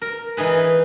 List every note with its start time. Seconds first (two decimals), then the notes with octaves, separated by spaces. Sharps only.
0.02 A#4
0.37 E3 D#4 G#4 B4